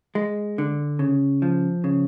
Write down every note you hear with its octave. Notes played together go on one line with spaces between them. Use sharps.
G#3
D3
C#3
F3
C#3